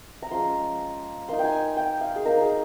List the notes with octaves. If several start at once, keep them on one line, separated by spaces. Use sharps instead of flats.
A#5
F3 G#3 C#4 C6
A#3 D#4 C6
G5
G#5
G5
F5
G#4
A#3 D#4 A#4
G#4